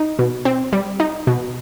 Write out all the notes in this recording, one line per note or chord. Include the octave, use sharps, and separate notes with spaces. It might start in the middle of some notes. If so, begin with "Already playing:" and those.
Already playing: D#4
B2
C4
G3
D#4
B2